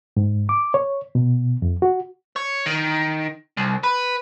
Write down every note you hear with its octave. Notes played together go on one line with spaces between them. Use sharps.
G#2
D6
C#5
B2
F2
F#4
C#5
D#3
C2
B4